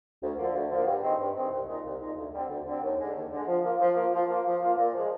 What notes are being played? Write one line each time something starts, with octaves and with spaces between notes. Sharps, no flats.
D2
D3 F3 A#3
D2
D3 F3 A#3
G2
D#3 G#3 C4
G2
D#3 G#3 C4
C2
A#2 G#3 D#4
C2
A#2 G#3 D#4
D2
D3 G3 C4
D2
D3 G3 C4
D#2
D3 G#3
D#2
D3 G#3
F3
A#3 F4
F3
A#3 F4
F3
A#3 F4
F3
A#3 F4
A#2
F3 G#3